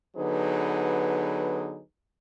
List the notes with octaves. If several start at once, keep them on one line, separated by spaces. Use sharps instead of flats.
D3 F#3 B3 D#4 G#4 B4